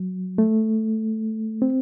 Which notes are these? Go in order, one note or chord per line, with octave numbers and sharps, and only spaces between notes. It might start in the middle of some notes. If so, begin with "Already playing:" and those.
Already playing: F#3
A3
C4